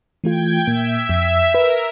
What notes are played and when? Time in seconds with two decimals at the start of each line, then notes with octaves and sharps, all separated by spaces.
0.24 E3 A3 F4 G5 G#6
0.67 A#2 A#3 E5
1.09 F2 B6
1.54 A#4 B4